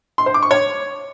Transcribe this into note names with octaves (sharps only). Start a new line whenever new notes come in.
C6
C5
D6
C#6
C#5